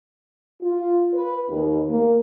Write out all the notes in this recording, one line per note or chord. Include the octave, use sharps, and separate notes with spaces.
F4
B4
D#2
A#3